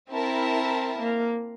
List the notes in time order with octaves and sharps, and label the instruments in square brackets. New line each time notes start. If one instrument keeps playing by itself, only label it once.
[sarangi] C4 [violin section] E4 A#4 E5 A5
[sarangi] A#3